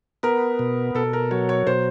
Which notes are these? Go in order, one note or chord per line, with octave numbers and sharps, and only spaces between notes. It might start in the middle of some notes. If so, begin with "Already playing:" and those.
B3 A#4
B2
B2 A4
A#4
F#3 C#5
C#5
B2 C5